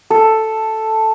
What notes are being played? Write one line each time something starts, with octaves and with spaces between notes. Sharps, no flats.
A4